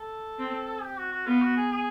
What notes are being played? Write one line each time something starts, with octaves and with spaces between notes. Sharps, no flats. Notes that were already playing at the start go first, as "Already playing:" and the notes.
Already playing: A4
C4
G4
F#4
F#4
B3 F4
F#4
G#4
G#4